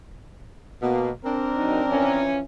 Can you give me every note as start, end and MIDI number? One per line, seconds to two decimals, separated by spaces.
0.83 1.10 47
0.83 1.10 58
1.25 2.25 60
1.25 2.25 62
1.25 2.25 70
1.56 1.82 54
1.56 1.82 63
1.88 2.40 52
1.88 2.40 53
1.88 2.40 61